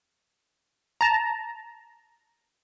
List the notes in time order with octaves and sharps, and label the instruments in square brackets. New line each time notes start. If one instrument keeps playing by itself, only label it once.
[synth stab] A5 A#5